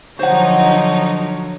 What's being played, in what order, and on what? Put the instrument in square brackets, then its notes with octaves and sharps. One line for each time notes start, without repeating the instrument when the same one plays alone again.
[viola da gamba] D3 F3 F#3 [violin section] D#4 [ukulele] C5 F#5 [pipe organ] C#5